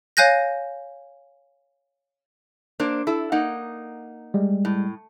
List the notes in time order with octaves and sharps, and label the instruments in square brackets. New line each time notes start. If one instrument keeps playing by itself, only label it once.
[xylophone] C#5 F5 G#5 F#6 G6 A#6
[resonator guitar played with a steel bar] A#3 D4 C5
E4 A4
A#3 D#4 F#5
[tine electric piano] G3 G#3
[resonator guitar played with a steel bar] A2